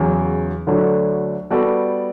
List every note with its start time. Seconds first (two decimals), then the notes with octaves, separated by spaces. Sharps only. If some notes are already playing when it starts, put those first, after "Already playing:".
Already playing: E2 C#3 F#3
0.67 D2 D3 F#3 A3 D4
1.50 G3 B3 F#4 A4 D5